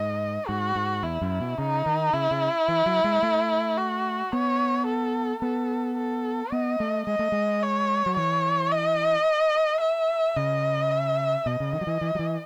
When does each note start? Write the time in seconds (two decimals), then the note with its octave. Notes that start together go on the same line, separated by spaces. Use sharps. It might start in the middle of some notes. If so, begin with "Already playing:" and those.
Already playing: G#2 D#5
0.48 G#2 F#4
0.76 G#2
1.03 E2 E4
1.22 F#2
1.40 B2
1.58 C#3 D#4
1.86 D#3
2.13 C#3 E4
2.31 C#3
2.68 E3
2.86 F#3
3.04 G#3
3.23 A3
3.78 F#4
4.32 B3 C#5
4.87 A4
5.42 B3 A4
5.98 A4
6.52 B3 D#5
6.80 A3
7.07 G#3 D#5
7.19 A3
7.32 G#3
7.62 C#5
8.06 F#3
8.17 E3 C#5
8.72 D#5
9.81 E5
10.36 C#3 D#5
10.91 E5
11.46 B2 D#5
11.60 C#3
11.73 D#3
11.81 F#3
11.87 E3
12.01 E3
12.15 F#3
12.19 E3